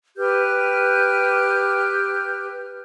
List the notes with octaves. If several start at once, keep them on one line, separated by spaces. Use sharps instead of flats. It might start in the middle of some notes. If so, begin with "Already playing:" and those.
G4 B4 F6 G6